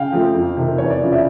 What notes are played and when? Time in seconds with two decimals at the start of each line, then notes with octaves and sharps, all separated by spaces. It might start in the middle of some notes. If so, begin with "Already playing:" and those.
Already playing: C#3 F5 G5
0.12 F3 A3 C4
0.34 F2
0.57 C3 D#3
0.78 E2 C#5
0.90 D5
1.01 C#3 F3
1.12 D5 E5